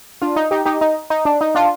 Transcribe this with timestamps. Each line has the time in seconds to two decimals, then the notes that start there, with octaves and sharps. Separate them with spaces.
0.22 D4 F4
0.36 D#4
0.51 D#4 G4
0.65 D#4 G4
0.81 D#4
1.10 D#4
1.25 D4
1.41 D#4
1.55 D4 F4